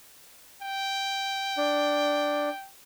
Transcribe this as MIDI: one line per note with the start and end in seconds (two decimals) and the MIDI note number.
0.62 2.68 79
1.57 2.49 62